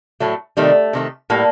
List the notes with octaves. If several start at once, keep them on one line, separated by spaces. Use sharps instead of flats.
A2 F#3 A3
C3 D#3 G3 A3
C3 D#3 A3
A2 G3 A#3